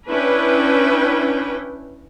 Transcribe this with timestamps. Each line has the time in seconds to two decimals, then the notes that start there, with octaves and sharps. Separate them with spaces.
0.10 C#4 D4 E4 B4 G5